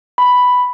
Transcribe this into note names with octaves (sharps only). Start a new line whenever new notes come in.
B5